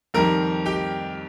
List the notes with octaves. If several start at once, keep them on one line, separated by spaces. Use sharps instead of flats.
F2 D#3 G3 A#4 A#5
G4 G5